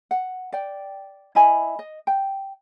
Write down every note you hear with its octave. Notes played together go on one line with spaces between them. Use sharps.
F#5
D5 G5
E4 D#5 G#5 B5
D#5
G5